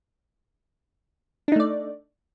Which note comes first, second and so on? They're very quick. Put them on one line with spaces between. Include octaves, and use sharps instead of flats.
D4 D#4 A3 D5